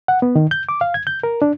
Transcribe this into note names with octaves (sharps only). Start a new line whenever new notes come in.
F#5
B3
D#3
G6
D6
F5
G#6
G6
A#4
D4